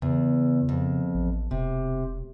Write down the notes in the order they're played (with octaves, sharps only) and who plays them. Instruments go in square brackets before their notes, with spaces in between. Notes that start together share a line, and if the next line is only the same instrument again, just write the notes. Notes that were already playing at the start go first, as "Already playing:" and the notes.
[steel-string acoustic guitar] E2 [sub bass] C#3
[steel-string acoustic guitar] F2
[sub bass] A1
[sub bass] E1 [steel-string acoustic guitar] C3